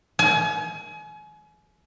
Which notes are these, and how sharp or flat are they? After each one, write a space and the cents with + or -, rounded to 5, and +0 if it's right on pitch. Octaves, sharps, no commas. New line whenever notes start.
G#5 +35